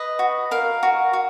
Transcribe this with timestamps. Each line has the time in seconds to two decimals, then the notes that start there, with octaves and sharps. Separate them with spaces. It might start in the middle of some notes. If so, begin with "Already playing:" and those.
Already playing: B4 D#5
0.19 F#4
0.51 A#4 F5
0.83 F#4
1.13 F#4